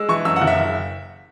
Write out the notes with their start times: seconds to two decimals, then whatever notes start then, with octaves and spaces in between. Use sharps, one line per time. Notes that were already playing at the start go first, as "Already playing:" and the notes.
Already playing: G#3 E6
0.09 E3 C#6
0.25 F#2 E6
0.36 F#5
0.41 F#1
0.47 E5